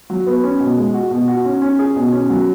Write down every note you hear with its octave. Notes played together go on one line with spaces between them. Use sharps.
F#3
B3
C#4
B2
G#3
F#4
B2
F#4
C#4
C#4
G#4
B2
C#4
F#3